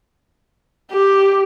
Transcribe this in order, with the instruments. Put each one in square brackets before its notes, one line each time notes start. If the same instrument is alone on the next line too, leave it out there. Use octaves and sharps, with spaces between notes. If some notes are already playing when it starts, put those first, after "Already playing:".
[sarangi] G4